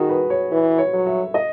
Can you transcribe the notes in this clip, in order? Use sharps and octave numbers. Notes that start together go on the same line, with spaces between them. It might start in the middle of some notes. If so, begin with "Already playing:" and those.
Already playing: D#3 F#4 G#4
B4
C#5
E3 B4
C#5
F#3
E5
D#5